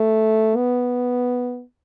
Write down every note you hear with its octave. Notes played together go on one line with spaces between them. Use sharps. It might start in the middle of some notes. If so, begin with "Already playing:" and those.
Already playing: A3
B3